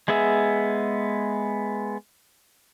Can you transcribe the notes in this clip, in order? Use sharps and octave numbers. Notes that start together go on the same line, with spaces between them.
G#3 B3 G#4 E5